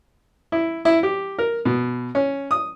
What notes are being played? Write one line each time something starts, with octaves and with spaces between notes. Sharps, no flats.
E4
E4
G4
A#4
B2
C#4
D#6